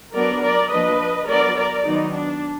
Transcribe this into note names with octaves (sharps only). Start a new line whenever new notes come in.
F#3 B3 D4 A#4 D5
A#4 D5
F3 A#3 D4 B4 D#5
F#3 B3 D4 A#4 D5
A#4 D5
D#3 F#3 B3 D#4
D4